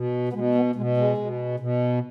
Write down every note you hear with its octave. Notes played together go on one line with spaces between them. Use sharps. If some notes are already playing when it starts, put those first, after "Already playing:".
Already playing: B2
B3
B2 G#3
B3
B2 G#3
G#3
B2
B2